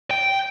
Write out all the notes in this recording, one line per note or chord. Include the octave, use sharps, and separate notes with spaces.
G5